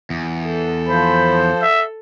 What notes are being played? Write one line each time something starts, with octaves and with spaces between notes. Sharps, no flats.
E2
A4
F3 C5 B5
E5